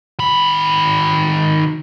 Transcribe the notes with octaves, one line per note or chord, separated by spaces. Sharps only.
D#3 B5